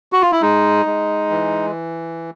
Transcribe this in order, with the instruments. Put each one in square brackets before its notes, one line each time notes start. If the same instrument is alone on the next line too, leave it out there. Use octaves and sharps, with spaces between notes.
[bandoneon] F#4
F4
E4
G#3 D#4
G#3
E3